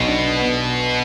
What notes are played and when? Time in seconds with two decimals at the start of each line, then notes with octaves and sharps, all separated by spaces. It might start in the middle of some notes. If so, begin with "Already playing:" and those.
Already playing: B1 B2 B3
0.08 D4
0.23 D4
0.37 B3